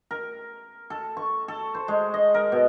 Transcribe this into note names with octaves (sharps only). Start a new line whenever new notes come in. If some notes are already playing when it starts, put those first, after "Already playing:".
A#4
A4
C#6
A4
C5
G#3
D#5
A#4
B2